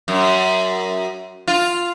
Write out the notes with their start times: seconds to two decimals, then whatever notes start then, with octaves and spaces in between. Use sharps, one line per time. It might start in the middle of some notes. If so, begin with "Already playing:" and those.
0.08 F#2
1.48 F4